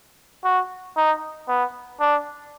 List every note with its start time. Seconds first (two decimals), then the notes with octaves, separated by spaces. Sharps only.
0.44 F#4
0.97 D#4
1.48 B3
2.00 D4